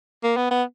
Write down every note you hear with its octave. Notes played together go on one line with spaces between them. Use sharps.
A#3
B3
B3